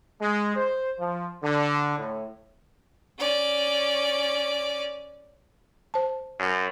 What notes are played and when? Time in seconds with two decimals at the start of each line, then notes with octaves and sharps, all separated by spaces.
0.21 G#3
0.56 C5
0.98 F3
1.42 D3
1.97 A2
3.18 C#4 D5
5.94 C5 A5
6.39 F#2